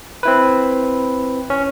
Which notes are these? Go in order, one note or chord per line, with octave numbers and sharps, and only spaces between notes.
C4 E4 B4
C#4